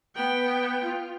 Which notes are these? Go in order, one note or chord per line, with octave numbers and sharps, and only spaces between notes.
B3 G5
F4